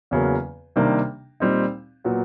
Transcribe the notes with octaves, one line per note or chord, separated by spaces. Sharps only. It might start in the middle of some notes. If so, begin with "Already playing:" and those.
E2 C#3 F#3 A#3
C3 D#3 G3 A#3 D4
A#2 G3 C4 D#4
A#2 F#3 B3